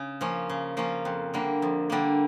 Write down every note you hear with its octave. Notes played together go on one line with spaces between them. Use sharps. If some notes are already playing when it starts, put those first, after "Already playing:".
Already playing: C#3
F3 A#3 C#4
C#3
F3 A#3 C#4
F2
D3 G3 A#3
F2
D3 G3 A#3